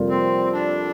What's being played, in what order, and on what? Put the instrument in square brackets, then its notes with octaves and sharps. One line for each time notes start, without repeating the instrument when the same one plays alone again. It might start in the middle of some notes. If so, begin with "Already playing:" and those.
Already playing: [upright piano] F2 C3 G3 A#3 F4
[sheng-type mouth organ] C4
D4